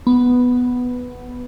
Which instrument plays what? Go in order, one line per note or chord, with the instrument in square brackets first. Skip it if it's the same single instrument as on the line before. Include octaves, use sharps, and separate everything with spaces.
[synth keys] B3